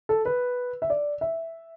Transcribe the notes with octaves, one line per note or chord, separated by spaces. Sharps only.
A4
B4
E5
D5
E5